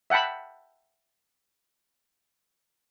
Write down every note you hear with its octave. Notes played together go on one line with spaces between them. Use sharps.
E5 F#5 G5 A5 B5